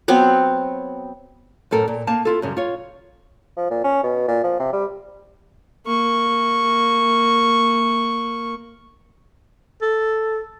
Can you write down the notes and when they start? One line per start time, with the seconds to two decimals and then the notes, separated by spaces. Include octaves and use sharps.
0.08 F#3 B3 C4
1.71 F#2 A2 A4 A#4
1.88 A#2
2.07 A#3 D#4 F5 A5
2.25 E4 F4 A4
2.42 F#2 C#3 G3
2.57 F4 C#5
3.57 F3
3.71 A#2
3.84 C#4
4.03 B2
4.28 A#2
4.44 F3
4.59 C3
4.73 G3
5.86 A#3 C#6
9.82 A4